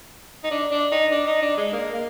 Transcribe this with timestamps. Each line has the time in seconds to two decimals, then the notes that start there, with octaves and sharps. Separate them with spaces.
0.44 D#4
0.51 D4
0.71 D4
0.92 D#4
1.12 D4
1.27 D#4
1.42 D4
1.57 G#3
1.73 A#3
1.94 A#3